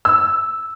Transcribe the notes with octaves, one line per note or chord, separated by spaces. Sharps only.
E6